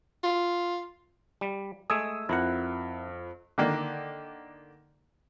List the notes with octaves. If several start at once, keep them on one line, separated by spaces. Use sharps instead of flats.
F4
G3
G#3 A3 G#5 D#6 E6
F2 E4 A#4 F#5
D3 D#3 A#3